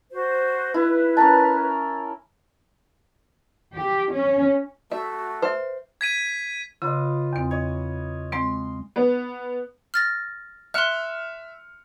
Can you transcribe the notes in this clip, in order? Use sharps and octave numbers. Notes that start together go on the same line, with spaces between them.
F#4 C5
E4 B4
C#4 A#4 A5
G4
C#4
A3 F#4 E5
B4 C5 E5
G#6 B6 D#7
C#3 F4 B4 D#5
E2 C4
C#5 D#5
G#3 C4 C6
B3
F6 A6 A#6
E5 C6 F6 F#6 C#7